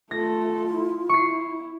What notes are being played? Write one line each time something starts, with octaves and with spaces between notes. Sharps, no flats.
A3 F4 A4 A#6
E4
E4 C#6 C7